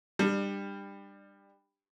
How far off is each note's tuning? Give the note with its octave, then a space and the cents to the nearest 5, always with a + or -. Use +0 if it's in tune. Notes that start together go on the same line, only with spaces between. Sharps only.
G3 +20 D4 +30